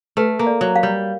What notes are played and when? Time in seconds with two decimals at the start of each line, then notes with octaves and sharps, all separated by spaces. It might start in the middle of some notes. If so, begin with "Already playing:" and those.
0.17 A3 B4
0.39 A#3
0.47 D5
0.61 F#3
0.76 F5
0.83 G3